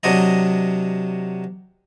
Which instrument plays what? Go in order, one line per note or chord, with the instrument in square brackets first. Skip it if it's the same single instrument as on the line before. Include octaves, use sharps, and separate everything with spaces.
[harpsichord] C3 F#3 D4 D#5 A#5